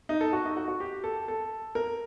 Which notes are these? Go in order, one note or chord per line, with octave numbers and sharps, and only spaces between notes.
D#4
A4
F#4
D#4
F#4
F#4
G4
A4
A4
A#4